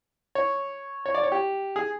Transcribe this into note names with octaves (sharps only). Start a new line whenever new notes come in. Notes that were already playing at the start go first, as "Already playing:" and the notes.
C#5
C#5
D5
C#5
G4
G#4